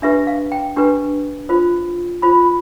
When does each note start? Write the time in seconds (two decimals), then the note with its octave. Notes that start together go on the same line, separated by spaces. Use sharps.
0.02 D4 G4 B4 E5
0.27 F5
0.52 G5
0.77 D4 G4 B4
1.49 F4 C5
2.22 F4 C5 B5